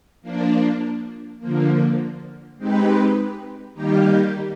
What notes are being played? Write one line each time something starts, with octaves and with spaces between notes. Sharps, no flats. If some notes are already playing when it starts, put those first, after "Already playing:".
F3 A#3 D4
D3 F3 A#3
G#3 C4 D#4 G4 B4
D#3 G3 A#3 D#4 G4